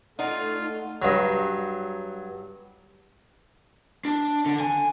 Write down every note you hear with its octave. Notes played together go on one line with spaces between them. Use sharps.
A3 D#4 F4 D5 D#5 F#5
G2 F#3
D4
D3
G#5